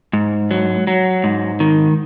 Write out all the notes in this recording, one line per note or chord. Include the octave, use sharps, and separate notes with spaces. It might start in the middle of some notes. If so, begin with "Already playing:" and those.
G#2
F#3
F#3
G#2
D#3